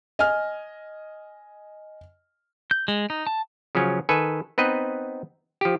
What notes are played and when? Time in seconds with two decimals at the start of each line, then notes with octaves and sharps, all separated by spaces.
0.19 D#5 G#5 F6
2.71 G6
2.88 G#3
3.10 D#4
3.27 A5
3.75 C#3 F3 F#3 C#4
4.09 D#3 A4 B4 G#5
4.58 B3 C4 D#4 B4 D#5
5.61 F3 G4